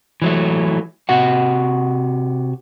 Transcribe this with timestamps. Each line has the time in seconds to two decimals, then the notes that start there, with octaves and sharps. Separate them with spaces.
0.22 E3 F#3 A3
1.09 C3 F#4 F#5